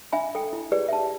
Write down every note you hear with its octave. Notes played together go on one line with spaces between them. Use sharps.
D4 E5 G#5 B5
A4 G5
E4
G4 G#4 B4 D5
E5 A5